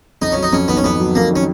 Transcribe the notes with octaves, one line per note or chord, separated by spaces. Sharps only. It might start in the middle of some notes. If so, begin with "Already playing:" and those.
F2 D#4
F#3 C#4
D#4
F2 C#4
D#3 B3
C#4
F2 B3
F#3
F2 A#3
D#3 C#4